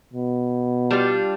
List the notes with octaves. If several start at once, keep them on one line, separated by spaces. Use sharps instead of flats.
B2
G3 D4 F4